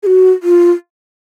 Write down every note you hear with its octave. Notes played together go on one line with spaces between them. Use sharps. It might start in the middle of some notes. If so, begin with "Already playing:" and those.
G#4
F#4
F4